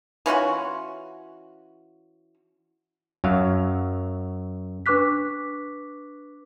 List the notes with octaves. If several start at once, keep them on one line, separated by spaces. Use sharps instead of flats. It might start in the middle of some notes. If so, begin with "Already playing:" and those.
E3 C#4 F4 F#4
F#2 F#3 F5
D4 B4 C#6 D6 F#6 B6